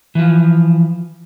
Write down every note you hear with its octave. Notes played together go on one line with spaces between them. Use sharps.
E3 F3